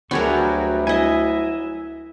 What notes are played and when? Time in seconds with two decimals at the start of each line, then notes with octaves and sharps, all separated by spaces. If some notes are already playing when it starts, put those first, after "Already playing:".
0.11 D2 F#3 G3 B3 D4 G#4 A#4 C#6
0.87 E4 D#5 E5 G#5